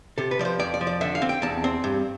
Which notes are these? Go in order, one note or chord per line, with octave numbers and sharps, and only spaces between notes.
C3 A4
B4
F3 D5
C5
F2 D5
D5
F3
D5
D3 E5
F5
C4
G5
E2 A5
C4
G2